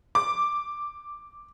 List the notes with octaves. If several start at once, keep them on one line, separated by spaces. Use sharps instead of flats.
D6